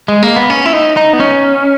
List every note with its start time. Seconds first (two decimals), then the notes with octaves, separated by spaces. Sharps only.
0.08 G#3
0.23 A#3
0.36 B3
0.50 C#4
0.66 E4
0.73 D#4
0.97 D#4
1.13 B3
1.20 C#4